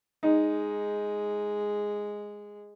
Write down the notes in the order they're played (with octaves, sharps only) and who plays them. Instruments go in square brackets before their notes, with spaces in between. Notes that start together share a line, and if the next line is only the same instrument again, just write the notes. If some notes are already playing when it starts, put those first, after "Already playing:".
[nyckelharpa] G#3 [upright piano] D#4